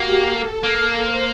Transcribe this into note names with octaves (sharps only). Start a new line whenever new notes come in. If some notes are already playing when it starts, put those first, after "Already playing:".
Already playing: A#3 F#4 G4
A4
A#3 A4
C5